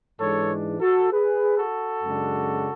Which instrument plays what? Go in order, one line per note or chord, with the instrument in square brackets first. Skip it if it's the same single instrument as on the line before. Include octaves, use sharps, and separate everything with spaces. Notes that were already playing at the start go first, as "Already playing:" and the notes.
[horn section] G#2 E3 G#3 D4 A4 C#5
F#4 A4
G#4 B4
F#4 A4
F#2 C#3 G#3 D4